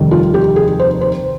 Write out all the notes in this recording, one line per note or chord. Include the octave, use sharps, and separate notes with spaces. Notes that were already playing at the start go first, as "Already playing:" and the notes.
Already playing: F1 D#2 D#3 G3
F4
G4
G#4
C5
C5